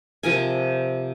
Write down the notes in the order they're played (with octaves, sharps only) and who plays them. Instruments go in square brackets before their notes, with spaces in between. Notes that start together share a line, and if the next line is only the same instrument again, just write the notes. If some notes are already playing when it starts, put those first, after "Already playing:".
[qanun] C3 F3 A#4 G#5